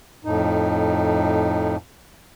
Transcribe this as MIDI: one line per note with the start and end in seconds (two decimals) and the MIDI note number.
0.25 1.76 41
0.25 1.76 45
0.25 1.76 63